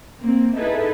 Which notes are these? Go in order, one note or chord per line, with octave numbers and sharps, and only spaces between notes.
A#3 C4
D#4 E4 G#4 A4 B4